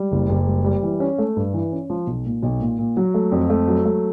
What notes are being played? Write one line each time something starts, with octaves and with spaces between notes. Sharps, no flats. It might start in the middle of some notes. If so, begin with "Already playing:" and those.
Already playing: G3
F#1
F#1
G3
G3
E3
C#4
A3
G2
E3
C#4
F3
B1
A#2
B1
A#2
A#2
F#3
A3
F2
A3
F#3
A3